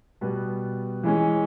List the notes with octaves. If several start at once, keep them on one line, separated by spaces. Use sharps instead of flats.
B2 G3 B3
E3 G#3 C#4